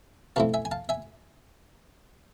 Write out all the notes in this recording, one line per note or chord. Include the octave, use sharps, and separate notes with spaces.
B2 A3 C4 E4 F5 A5
E5 G#5
G#5
F5 A5
E5 G#5